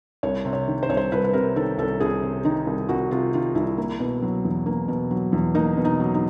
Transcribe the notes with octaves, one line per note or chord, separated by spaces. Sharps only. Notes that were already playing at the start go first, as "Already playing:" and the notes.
C2 C#5
C3
C#5
D#3
C5
C2 C#5
C5
C2 B4
B4
C3 A#4
D#3 A4
C2 A4
C2 G#4
C3
D#3 D#4
C2
C2 F#4
C3 F4
D#3 F4
C2 E4
A#3
B2
F#3
E2
A#3
B2
F#3
E2
A#3 D#4
B2
D#4
F#3
D#4